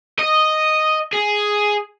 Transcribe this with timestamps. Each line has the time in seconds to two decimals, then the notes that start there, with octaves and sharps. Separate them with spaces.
0.19 D#5
1.13 G#4